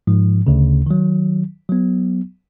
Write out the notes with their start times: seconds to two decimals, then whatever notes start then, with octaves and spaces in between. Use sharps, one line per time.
0.07 G#2 F3
0.47 D2 C#3
0.86 D#3 F#3
1.69 F#3 B3